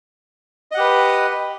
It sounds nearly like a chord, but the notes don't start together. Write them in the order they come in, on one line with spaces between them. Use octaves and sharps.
D#5 F#5 G4 B4